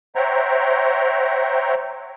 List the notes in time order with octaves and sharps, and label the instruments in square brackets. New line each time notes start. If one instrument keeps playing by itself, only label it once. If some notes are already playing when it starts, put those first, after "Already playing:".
[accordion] C5 C#5 E5 F#5 G5 A#5